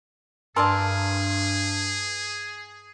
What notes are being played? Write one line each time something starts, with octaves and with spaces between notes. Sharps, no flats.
G2 G#4 A#4 D5 G#5 A5 C6 E6